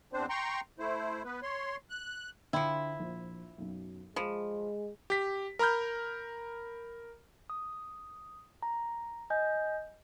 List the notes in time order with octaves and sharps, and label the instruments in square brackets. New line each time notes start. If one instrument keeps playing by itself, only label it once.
[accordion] E2 C4 D4 C5
G5 A#5 C6 C#6
A3 E4 C5
B3 B4
C#5 C6
F#6
[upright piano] D3 G5 C6 [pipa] F3 E4
[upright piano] A#1
B1 F#2
[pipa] F3 [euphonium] G#3 [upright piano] B5
[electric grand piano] G4 B6
A#4 A#5 B5 F6 G6
[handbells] D#6
A#5
D#5 G#5 G6